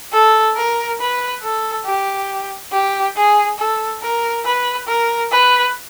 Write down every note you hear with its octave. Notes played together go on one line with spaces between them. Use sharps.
A4
A#4
B4
A4
G4
G4
G#4
A4
A#4
B4
A#4
B4